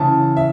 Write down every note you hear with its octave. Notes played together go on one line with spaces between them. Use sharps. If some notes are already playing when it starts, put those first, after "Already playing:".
Already playing: C#3 E3 A5
E5